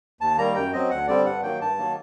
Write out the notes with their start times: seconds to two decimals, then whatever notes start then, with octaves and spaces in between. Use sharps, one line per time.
0.21 D#2 A5
0.38 D#3 G3 A#3 A#5
0.55 F#2 G5
0.73 F#3 C4 D#5
0.91 D2 F#5
1.08 D3 G3 C4 D5
1.26 G2 F#5
1.43 D#3 F#3 A#3 G5
1.61 G2 A5
1.78 D#3 F#3 A#3